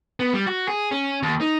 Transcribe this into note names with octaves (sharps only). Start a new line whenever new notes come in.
B3
G3
F#4
G#4
C#4
D#2
D#4